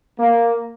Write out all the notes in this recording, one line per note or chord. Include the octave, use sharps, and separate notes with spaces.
A#3